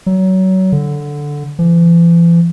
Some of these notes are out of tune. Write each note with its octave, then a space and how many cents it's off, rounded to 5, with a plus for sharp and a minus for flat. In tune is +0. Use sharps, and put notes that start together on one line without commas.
F#3 +25
D3 -5
E3 +45